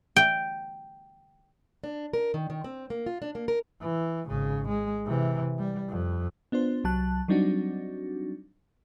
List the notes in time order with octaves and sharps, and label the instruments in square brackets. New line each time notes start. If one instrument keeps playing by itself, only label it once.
[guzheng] G5
[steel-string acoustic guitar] D4
A#4
D#3
D#3
C4
A#3
F4
D4
A#3
A#4
[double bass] E3
G#1 C#3
G#3
C3 E3
G3
F2
[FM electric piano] B3 D4 F4 C5
C2 F#3 A5 F#6
F#3 G3 C4 D4 D#4 F#4